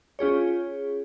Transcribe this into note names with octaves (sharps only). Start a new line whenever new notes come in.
C#4 F4 G#4 C#5